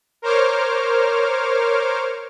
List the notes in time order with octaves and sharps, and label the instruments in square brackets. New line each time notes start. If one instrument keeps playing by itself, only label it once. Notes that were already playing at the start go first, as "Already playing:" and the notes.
[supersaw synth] A#4 C5 C#5 D6 F6